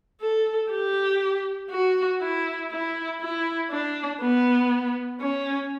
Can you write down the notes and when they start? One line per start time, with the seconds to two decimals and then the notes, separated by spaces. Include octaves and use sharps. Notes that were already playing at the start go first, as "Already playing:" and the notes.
0.21 A4
0.70 G4
1.71 F#4
2.21 E4
2.71 E4
3.20 E4
3.71 D4
4.21 B3
5.21 C#4